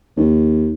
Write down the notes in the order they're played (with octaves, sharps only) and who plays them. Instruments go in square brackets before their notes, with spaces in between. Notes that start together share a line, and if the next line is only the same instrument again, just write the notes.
[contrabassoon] D#2